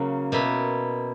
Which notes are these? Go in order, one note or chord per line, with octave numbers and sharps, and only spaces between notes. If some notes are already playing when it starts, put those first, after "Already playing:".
Already playing: C#3 F#3 A#3 C#4
B2 A#3 E4